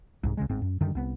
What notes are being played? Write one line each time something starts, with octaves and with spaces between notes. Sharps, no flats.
C2 G#2
C2 C#3 G#3
G1 G#2 C4
F#2
F#2 D3 D#3 G3
C2 B3